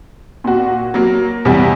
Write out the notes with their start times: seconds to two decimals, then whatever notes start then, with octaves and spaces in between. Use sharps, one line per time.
0.44 A#2 F#4
0.94 F#3 A#3
1.45 E2 C3 G3 B3